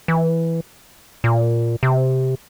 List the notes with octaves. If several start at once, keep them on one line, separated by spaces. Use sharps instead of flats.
E3
A#2
C3